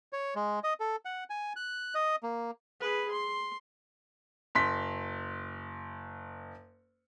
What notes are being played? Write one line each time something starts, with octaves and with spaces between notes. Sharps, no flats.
C#5
G#3
D#5
A4
F#5
G#5
F#6
D#5
A#3
G#4 B4
C6
F#1 C6 B6